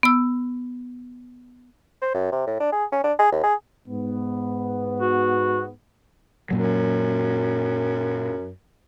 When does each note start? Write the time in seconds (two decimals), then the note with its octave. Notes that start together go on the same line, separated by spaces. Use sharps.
0.03 B3 E6
2.02 C5
2.14 F#2
2.32 C3
2.47 A2
2.60 D4
2.72 G#4
2.92 C#4
3.04 D4
3.19 G#4
3.32 D#2
3.43 G#4
3.87 G#2 B3
5.01 F#4
6.51 F#2 A#2 F#3